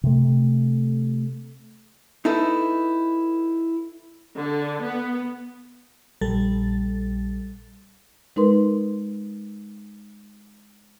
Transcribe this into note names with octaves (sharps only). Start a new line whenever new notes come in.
C3 A3
D#4 E4 A4 B4
D3
B3
A#1 G3 A4 A6
G#3 D#4 A#4 B4 C6